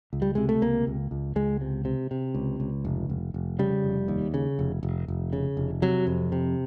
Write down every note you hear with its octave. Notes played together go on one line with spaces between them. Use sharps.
C#2
G3
C3 G#3
A3
C#2 A#3
C#2
C#2
C#2 G#3
C3
C3
C3
C#2
C#2
F1
F1
F1
C#3 G3
F1
D#2
C#3
F1
F1
F1
C#3
F1
C3 F#3
F2
C3